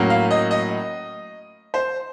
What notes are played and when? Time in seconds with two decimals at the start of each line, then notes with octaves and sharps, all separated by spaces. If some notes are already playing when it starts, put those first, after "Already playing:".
Already playing: A2 F#3 A#3 C#4
0.10 F5
0.31 D#5
0.51 D#5
1.74 C5